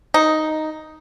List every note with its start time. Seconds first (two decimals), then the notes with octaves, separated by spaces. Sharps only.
0.14 D#4